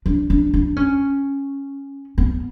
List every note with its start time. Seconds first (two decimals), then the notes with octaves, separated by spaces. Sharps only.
0.06 D4
0.30 D4
0.54 D4
0.77 C#4
2.18 B3